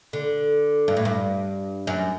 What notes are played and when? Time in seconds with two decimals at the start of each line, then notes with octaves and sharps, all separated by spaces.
0.13 D3
0.88 G2
0.97 A2
1.05 G2
1.87 F#2